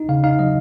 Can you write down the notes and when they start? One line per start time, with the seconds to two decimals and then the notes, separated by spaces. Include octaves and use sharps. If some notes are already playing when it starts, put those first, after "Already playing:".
Already playing: D#4
0.09 C#3 F5
0.23 D#4 F5
0.39 F#3 D#5